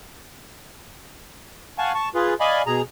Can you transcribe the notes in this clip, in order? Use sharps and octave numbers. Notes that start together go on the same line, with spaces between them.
F5 F#5 G#5 A5 C#6
A5 C#6
F4 G#4 B4
D5 D#5 F5 G#5 B5
B2 G#4 A#5